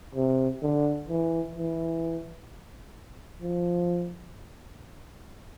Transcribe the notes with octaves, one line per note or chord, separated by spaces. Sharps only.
C3
D3
E3
E3
F3